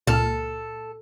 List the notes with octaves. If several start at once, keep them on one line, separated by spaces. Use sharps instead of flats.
C#2 A#2 A4 F6